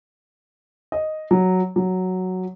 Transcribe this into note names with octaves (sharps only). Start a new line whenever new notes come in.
D#5
F#3
F#3